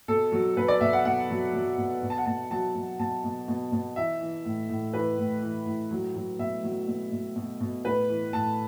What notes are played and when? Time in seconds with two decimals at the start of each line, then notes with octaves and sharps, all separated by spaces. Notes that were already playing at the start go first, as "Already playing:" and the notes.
0.08 B2 A4
0.32 F#3
0.57 B2 B4
0.68 D5
0.81 B2 E5
0.93 F#5
1.05 B2 F#5
1.30 F#3
1.53 F#3
1.78 B2
2.02 B2
2.10 A5
2.18 F#5
2.25 B2 A5
2.51 F#3 A5
2.75 F#3
2.99 B2 A5
3.24 B2
3.48 B2
3.72 B2
3.96 E3 E5
4.21 E3
4.45 A2
4.69 A2
4.94 E3 B4
5.18 A2
5.42 E3
5.66 A2
5.91 F#3
6.15 F#3
6.39 B2 E5
6.64 F#3
6.88 B2
7.12 B2
7.36 B2
7.61 B2
7.85 A2 B4
8.09 E3
8.33 A2 A5